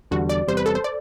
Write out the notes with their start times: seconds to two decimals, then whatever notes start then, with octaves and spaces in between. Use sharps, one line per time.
0.11 E2 D3 G3 F#4
0.29 D5
0.47 E2 C3 G3 C5
0.57 B4
0.66 A4
0.75 C5
0.84 D5